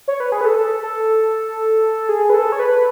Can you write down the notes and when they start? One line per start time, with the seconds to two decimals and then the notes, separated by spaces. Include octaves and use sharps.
0.08 C#5
0.20 B4
0.32 G#4
0.41 B4
0.45 A4
0.58 A4
0.83 A4
2.09 G#4
2.30 B4
2.34 A4
2.52 C#5
2.59 B4